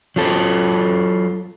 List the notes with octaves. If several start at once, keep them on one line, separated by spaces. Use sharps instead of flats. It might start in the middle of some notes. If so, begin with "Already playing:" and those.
F#3 F4 A4